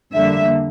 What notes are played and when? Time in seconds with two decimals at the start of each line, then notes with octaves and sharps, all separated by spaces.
0.12 F2 D3 G3 A#3 E5